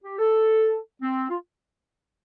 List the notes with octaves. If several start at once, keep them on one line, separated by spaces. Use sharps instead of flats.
G4
A4
C4
F4